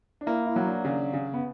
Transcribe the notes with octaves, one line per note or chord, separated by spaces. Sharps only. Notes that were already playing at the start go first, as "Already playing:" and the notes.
D4
A#3 E4
E4
F#3
D4
C#3 D4
C#3
B3